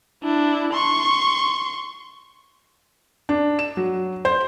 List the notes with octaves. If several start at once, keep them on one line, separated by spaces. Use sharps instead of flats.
D4 E4
C6 C#6
D4
E7
F#3
C5